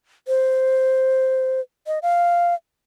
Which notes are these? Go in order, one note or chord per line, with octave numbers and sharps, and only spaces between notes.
C5
D#5
F5